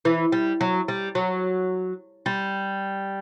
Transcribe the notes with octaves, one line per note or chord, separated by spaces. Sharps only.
E3
G3
F#3
G3
F#3
G3